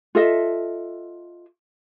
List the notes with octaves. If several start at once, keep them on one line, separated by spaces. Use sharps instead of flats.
F4 A4 D#5 E5